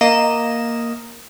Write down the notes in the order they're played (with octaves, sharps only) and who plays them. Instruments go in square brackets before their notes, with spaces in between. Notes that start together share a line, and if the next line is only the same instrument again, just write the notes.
[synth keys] A#3 D#5 E7